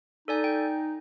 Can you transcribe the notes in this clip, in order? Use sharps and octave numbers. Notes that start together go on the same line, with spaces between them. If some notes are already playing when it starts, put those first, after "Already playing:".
D#4 A4 D5 G#5
G5